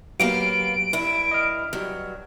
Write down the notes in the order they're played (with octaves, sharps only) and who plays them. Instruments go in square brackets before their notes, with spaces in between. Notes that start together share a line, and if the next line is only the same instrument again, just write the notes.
[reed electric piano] F#3 G4 [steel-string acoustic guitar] A#3 B3 F5 [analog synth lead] D7
[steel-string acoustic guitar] G2 E4
[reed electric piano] D#5 F6
[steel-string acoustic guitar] G2 F#3